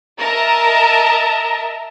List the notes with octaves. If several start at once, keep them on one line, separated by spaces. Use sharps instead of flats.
A#4 D#5 E5 A5 A#5